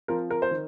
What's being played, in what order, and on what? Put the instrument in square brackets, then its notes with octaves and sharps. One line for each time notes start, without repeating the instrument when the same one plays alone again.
[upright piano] F3 C4 A#4
A#4
C5
D#3